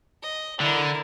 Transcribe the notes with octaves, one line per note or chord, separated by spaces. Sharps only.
D#5
D3 E4 A#4